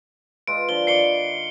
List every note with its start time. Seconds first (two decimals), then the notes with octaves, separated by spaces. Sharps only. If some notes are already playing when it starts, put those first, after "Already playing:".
0.47 G#3 F4 B4 D7
0.69 D3 F3 G7
0.87 D#3 D5 C7 C#7 G7